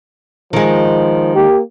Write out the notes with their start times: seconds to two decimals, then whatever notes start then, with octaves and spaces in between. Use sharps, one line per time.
0.53 D#3 F3 G#3
1.36 A#3 G4